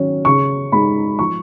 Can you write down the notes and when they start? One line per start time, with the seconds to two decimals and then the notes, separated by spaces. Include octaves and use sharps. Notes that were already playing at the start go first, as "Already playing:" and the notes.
Already playing: D#3 F#3 C#4
0.25 C#3 C#6
0.72 G#3 D#4 B5
1.19 F3 C#6